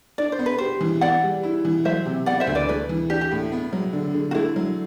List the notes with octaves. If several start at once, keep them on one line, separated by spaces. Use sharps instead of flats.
D4 D5
C5
B3
B4
G4 C5
E3
B3 D5 F#5
G3
E4
E3
F#3 C5 E5
C3
B3 D5 F#5
C5 E5
D2
B4 D5
A3 B4
E3
D4 G4
G4
A2
B3
F#3
D3
D3
F#4
A3 E4
F#3